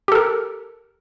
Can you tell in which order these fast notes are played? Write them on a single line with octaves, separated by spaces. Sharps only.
G4 A4 A#4